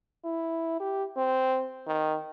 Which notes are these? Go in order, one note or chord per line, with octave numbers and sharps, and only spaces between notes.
E4
G4
C4
D#3